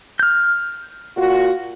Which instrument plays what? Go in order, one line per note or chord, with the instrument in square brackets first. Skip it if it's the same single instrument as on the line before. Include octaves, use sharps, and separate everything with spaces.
[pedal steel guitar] F6 G6
[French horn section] A#2 F4 F#4